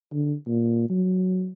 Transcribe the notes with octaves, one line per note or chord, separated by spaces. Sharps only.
D3
A#2
F#3